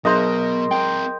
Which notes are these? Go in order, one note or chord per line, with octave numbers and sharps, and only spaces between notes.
B2 F#3 B3 G#4 A#4 C5 D#5 A#6
C4 A#4 G5